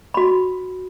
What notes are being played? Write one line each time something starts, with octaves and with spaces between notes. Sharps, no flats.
F#4 B5